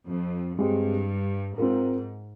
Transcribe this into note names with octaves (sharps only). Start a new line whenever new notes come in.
F2
G2 G#3 C4 G4
G#2 C4 F4 A#4